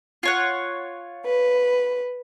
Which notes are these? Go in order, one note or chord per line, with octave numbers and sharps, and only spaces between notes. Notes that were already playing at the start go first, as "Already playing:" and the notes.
F4 C#5 F#5
B4